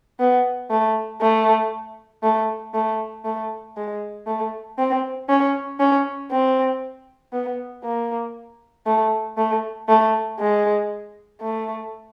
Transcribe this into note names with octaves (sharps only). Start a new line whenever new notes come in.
B3
A3
A3
A3
A3
A3
G#3
A3
C4
C#4
C#4
C4
B3
A#3
A3
A3
A3
G#3
A3